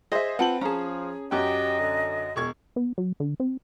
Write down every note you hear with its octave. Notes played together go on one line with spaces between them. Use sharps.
G#4 C5 D#5 E5
C4 F4 B4 F#5 A5 F#7
F3 C#4 G#4 A5 A#5
F#2 F#4 G4 D#5 G5
D3
E1 G#3 C#6 G#6
B3
F#3
D3
C4